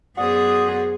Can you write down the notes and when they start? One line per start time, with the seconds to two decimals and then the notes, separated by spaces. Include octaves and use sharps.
0.17 F#2 B3 F#4 G#4 C5 D5 D#6